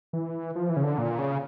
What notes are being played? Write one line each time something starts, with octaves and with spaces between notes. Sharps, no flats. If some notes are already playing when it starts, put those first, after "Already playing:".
E3
F3
E3
C#3
D3
A#2
C#3